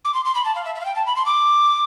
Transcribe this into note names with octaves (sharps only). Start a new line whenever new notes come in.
D6
C6
C6
B5
A5
F5
E5
E5
F5
G5
A5
B5
C6
D6